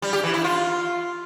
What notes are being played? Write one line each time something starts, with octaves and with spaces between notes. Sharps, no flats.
G3
G4
E3
E4
F4